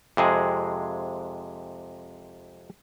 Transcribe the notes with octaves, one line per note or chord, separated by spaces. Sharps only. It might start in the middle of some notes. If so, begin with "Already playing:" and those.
F2 C3 G#3 G#4